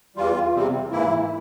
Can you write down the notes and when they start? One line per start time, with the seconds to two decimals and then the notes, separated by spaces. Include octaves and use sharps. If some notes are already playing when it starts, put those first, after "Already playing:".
0.16 E2 E3 G3 F4
0.54 E2 C3 G3 C4
0.91 G#2 E3 A#3 E4